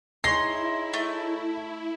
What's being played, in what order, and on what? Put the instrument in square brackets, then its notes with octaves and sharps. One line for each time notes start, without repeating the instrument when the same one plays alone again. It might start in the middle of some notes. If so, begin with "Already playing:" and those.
[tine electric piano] D#4 G#4 C#5 [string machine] E4 [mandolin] C6 [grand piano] A#6
[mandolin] A3